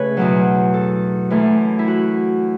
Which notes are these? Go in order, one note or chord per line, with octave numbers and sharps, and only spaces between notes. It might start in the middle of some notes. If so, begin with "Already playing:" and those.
Already playing: C#3 A3 A4 B4 C#5
E2 B2 F#3
A4
F#2 E3 A3
E4
F#4